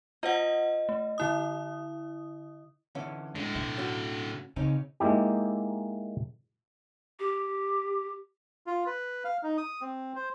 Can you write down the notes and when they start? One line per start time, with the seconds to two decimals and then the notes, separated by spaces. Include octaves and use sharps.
0.23 F4 C5 D#5 F#5
0.89 A3
1.18 D3 E4 D#6
2.95 D3 E3 C#4
3.36 A2 D3 G#3
3.55 B2 E5
3.77 C#4 F#4
4.56 C#3 C4 C#4 D#4
5.00 G#3 A#3 D#4 E4 G4
7.20 G4
8.67 F4
8.86 B4
9.24 F5
9.43 D#4
9.57 D#6
9.81 C4
10.15 C5